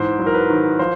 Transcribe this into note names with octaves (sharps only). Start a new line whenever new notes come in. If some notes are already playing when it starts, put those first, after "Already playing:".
Already playing: G#2 E3 C5
F#3
A#4
B4
D#3
F3 C5